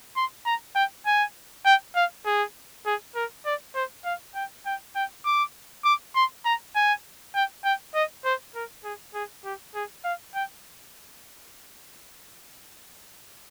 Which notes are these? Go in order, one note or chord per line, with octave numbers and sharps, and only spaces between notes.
C6
A#5
G5
G#5
G5
F5
G#4
G#4
A#4
D5
C5
F5
G5
G5
G5
D6
D6
C6
A#5
G#5
G5
G5
D#5
C5
A#4
G#4
G#4
G4
G#4
F5
G5